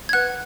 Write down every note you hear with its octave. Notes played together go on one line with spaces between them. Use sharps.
G#6
B4 F#5 F#6